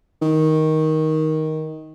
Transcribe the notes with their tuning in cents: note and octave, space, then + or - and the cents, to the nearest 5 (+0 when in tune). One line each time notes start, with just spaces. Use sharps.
D#3 +10